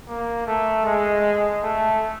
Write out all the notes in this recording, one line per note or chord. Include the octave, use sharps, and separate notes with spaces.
A#3
A3
G#3
A3